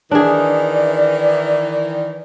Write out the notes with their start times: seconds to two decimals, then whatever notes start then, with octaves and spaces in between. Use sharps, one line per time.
0.11 D#3 E3 D4 G#4 D5